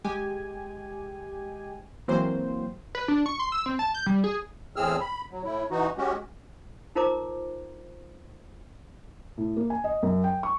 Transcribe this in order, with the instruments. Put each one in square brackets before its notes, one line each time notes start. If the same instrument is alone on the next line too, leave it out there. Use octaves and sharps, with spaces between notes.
[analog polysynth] G#3 G4 G#5
E3 F#3 A#3 C4 C5
[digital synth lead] B4
D4
C#6
C6
E6
C4
A5
G6
G3
G#4
[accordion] E2 A2 C4 G#4 E6 F6
B5
F#3
A2 E4
E3 D#4 F#4
G#3 C#4 F#4 G4
[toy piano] D#4 F4 A#4 C5 A#5 D6
[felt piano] A2
A#3
G#5
D#5
F#2
G5
C#6